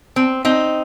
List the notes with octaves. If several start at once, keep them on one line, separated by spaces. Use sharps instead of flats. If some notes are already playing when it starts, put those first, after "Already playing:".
C4
C4 D#4